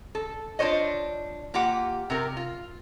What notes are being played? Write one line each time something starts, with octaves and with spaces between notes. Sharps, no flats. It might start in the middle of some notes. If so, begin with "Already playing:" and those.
A4
D4 F4 C5 C#5 D#5
A#3 F4 G4 F#5
C3 G4 A#4
F4